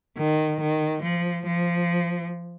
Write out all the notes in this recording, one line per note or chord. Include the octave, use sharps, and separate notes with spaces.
D#3
D#3
F3
F3